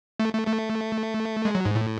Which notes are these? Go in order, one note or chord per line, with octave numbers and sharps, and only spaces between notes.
A3
A3
A3
G#3
F#3
G#2
A2